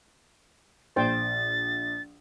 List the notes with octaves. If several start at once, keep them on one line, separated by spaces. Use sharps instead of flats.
A#1 C5 G5 A6